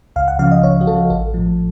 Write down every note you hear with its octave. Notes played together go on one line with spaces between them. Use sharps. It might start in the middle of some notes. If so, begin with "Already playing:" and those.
C#2 F5
F#5
C#3 F3 F5
D#5
C#2 C#5
F#4
C#3 F3 A4
A1 A4
A2 F3